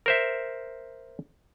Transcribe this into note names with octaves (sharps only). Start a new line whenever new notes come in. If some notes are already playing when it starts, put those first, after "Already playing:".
A#4 C5 E5